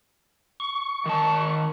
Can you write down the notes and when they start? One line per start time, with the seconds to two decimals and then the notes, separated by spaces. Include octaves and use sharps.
0.60 C#6
1.06 D#3 A5